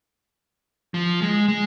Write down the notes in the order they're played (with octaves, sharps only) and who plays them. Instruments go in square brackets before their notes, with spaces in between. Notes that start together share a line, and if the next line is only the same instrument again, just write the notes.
[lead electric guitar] F3
G#3
G#3